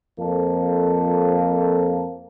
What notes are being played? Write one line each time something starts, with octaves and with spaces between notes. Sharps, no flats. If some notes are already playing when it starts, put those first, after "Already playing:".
F2 F3 A#3 A4